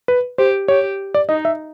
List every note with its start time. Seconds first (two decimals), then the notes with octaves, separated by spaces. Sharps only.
0.08 B4
0.38 G4 C5
0.68 G4 C#5
1.14 D5
1.29 D#4 D#5
1.45 E5